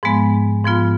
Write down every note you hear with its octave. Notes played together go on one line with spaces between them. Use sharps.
G#2 F3 G#3 B3
G#2 F3 B3 F4